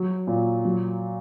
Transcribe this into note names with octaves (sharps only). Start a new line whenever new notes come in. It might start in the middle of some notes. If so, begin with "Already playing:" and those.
Already playing: F#3
A#2
F#3